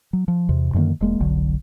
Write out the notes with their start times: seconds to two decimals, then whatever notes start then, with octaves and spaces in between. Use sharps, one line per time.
0.13 F#3
0.28 F3
0.49 E2 C3
0.74 F#2 D3 D#3 A#3
1.01 E1 G#3 A#3
1.20 F1 B1 D3 F#3